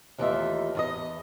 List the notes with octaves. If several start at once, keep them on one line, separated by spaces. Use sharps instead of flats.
D#2 E3 A3 D#4 F4 E5
E2 F4 D#5